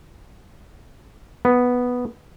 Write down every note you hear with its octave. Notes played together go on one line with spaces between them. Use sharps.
B3